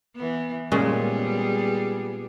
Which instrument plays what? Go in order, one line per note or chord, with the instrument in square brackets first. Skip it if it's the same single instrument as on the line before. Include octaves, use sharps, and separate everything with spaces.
[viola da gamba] E3 B3
[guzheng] A#2 G#3 C#4 [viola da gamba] G3 B3 G#4